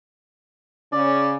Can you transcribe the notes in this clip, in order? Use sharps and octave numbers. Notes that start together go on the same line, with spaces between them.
C#3 C#4 D5